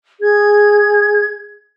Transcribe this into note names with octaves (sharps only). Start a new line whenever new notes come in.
G#4 G#6